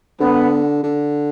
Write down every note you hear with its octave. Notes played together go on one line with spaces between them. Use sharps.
D3 B3
D3